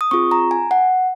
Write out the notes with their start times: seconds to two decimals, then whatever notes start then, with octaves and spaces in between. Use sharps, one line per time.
0.01 D#6
0.11 C4 F4 G#4 C#6
0.31 A#5
0.51 G#5
0.71 F#5